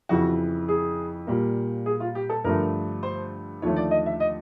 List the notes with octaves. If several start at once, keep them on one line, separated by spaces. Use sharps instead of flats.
F2 C#3 E3 F#4
G#4
A#2 G3 A#3
G#4
F4
G4
A4
G2 D3 F3 A3 A#4
C5
D#2 D3 F3 A3 C#5
D5
D#5
E5
D#5